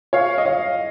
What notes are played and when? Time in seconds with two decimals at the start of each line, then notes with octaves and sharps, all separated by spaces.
0.13 C#5 F5
0.38 D#5
0.45 C#5 F5